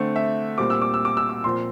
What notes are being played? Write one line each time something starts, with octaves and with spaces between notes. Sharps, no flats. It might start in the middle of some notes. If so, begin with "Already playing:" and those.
Already playing: D3 A3 C4
E5
A#2 G3 C4 D6
E6
D6
E6
D6
E6
D6
A#2 F3 C4 C6